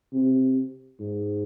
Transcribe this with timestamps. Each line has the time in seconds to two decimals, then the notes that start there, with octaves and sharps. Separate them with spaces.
0.13 C3
1.00 G#2